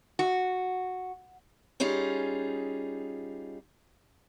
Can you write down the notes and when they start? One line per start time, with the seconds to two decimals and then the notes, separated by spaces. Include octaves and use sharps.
0.19 F#4
1.80 G3 C#4 D#4 F4 G#4